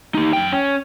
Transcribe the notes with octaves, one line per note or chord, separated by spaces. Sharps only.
D#4 G4
F#2 G5
C#4